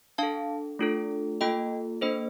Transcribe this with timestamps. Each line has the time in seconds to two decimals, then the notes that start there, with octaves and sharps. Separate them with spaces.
0.18 D4 A4 F5 A5
0.79 A3 D4 F4 A4
1.41 A#3 F4 A4 D#5 G5
2.01 A#3 D4 A4 C5 D#5